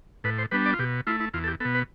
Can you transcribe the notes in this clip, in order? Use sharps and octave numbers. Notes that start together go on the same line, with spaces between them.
A2 B4
C5
G3 B3 D4 B4
D5
F4
B2 G4
A3 E4 F4
E4
E2 F4
A4
G4
B2 B3 A4
B4